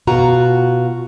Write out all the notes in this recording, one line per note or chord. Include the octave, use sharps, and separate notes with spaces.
B2 F4 F#4 A#5